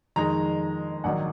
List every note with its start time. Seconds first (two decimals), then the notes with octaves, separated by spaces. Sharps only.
0.16 F2 D#3 G#3 A#5
1.04 A#1 G#2 D#3 F#3 F#5